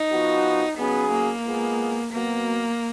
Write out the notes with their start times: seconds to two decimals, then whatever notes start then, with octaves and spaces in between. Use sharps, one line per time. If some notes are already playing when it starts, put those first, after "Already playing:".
Already playing: D#4
0.10 F3 B3 F#4
0.78 C#3 F#3 B3 C#4 G#4
1.12 A#3
1.45 G#3 B3 F4 G#4
2.12 B2 F#3 A#3 B3